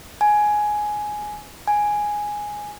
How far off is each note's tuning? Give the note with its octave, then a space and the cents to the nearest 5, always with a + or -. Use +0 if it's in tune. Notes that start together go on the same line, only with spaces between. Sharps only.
G#5 +10
G#5 +0